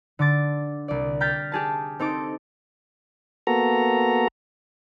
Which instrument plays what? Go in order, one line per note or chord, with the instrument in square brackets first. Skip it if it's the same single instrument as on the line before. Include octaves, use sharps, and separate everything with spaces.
[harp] D3 D6 A6
C2 D5
G5 A#5 F6 G6 A6 B6
G4 G#4 A5
C4 D#4 A4 D6
[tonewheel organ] A#3 B3 F#4 A4 A#5